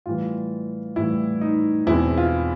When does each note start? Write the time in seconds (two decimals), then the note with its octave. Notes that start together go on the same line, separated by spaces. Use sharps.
0.06 A2 E3 G3 F4
0.96 A2 E3 G3 E4
1.41 D#4
1.87 E2 B2 G#3 C4 E4
2.18 F4